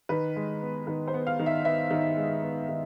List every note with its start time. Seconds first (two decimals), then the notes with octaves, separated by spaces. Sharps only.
0.09 D#3 B4
0.36 G#3
0.62 B3
0.87 D#3 B4
1.08 C5
1.14 B3
1.27 F5
1.39 D#3
1.46 E5
1.65 B3 E5
1.91 D#3
2.17 G#3
2.43 B3
2.69 D#3